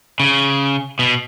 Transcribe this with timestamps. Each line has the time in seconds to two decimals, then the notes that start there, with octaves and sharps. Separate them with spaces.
0.20 C#3
0.99 B2